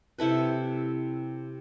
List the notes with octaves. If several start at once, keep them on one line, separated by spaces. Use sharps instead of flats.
C3 E4 A4 B4